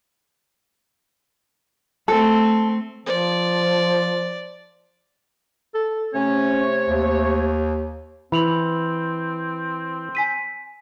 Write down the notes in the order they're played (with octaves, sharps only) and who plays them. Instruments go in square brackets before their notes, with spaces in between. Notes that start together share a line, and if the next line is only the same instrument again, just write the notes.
[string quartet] A3 C4 [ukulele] A4
[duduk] F3 [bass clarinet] C5 [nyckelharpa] D5
[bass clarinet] A4
[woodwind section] C3 A3 C#5 [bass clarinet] C#4
[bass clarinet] D#2
[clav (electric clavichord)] E3 [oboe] C4 [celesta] B5 F7 F#7
[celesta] G#5 B6 D#7